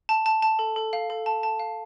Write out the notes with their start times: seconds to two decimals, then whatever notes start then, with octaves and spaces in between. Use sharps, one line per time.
0.09 A5
0.26 A5
0.42 A5
0.59 A4
0.76 A4
0.93 F5
1.10 A4
1.26 A5
1.43 A5
1.60 F5